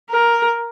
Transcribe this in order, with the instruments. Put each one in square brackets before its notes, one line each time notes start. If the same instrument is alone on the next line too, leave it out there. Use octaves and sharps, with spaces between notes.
[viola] A#4